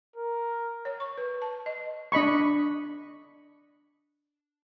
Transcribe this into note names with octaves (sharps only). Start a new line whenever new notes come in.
A#4
C#5
C#6
B4
A5
D#5
D4 D#5 B5 C#6